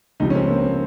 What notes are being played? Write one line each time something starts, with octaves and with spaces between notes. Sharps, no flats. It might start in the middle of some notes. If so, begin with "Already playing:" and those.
C#2 C3 F3 D#4
C#4
C4
A#3
C4